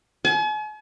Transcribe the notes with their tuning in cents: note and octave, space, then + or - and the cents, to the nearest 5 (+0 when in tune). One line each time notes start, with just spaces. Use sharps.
G#5 +45